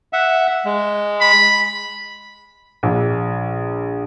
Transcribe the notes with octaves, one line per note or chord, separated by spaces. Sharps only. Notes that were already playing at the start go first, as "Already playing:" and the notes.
E5 F#5
G#3
B5
A#1